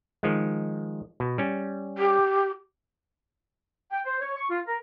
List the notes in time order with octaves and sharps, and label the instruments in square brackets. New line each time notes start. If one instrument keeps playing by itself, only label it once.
[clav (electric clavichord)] D#3 F3 G#3
B2
G3 C#4
[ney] G4
[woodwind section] G5
C5
C#5
C#6
F4
A#4